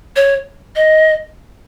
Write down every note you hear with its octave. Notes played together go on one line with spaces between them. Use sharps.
C#5
D#5